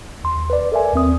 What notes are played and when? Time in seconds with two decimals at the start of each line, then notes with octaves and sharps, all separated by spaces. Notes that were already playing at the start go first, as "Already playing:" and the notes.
0.24 D#2 C6
0.50 B4 D5
0.72 A4 A#4 D5 E5 G#5
0.94 D#2 C4 D#6